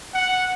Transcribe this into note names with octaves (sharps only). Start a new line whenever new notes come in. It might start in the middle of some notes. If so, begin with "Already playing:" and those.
F#5